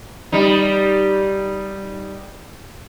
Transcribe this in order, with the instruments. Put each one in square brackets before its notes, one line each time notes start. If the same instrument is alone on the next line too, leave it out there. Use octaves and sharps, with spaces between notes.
[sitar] G3 D#4